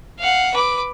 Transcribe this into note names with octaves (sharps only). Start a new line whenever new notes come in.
F5 F#5
B4 D6